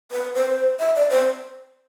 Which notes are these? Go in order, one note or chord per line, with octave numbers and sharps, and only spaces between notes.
B4
C5
E5
D5
C5